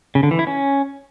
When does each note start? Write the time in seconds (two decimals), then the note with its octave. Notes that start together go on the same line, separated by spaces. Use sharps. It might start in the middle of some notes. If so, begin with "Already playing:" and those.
0.15 C#3
0.23 D3
0.31 E3
0.39 E4
0.47 C#4